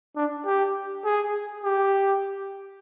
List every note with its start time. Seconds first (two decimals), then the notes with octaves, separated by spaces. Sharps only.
0.16 D4
0.45 G4
1.04 G#4
1.64 G4